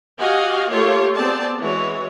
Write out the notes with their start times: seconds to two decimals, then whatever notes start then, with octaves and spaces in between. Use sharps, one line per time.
0.18 F#4 G4 D#5 F5 G#5
0.71 A3 A#3 F4 G4 A4 C#5
1.15 B3 C4 G#4 D5 A5
1.60 E3 G#3 F#4 C#5